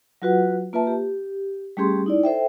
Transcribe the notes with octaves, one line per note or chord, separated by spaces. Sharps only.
F#3 F4 F#4 B4 F#5
A#3 F4 B4 E5 A5
G4
G3 A3 C#4 G4 G#4 C6
D#4 E4 D5
A4 C5 E5 G5